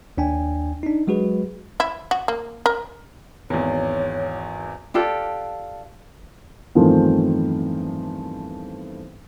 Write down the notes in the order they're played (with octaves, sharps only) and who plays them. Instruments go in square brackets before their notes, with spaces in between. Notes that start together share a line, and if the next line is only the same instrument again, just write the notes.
[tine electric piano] D#2 D4 G5 G#5
D4 D#4
F#3 G#3 F#4 G#4 B4
[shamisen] E4
F#4
A#3
A#4
[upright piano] G#1 E2 [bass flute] C#5
[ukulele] D4 F4 G4 A4
[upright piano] E2 G2 D#3 F3 A3 C4